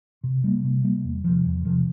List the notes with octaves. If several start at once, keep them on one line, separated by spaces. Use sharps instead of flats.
C3
G3 A#3
C3
G3 A#3
E2
C3 F3
E2
C3 F3